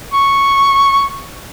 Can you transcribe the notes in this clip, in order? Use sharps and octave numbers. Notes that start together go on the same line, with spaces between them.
C#6